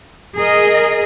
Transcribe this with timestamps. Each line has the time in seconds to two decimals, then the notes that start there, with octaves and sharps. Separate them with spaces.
0.36 G#4 A#4 D#5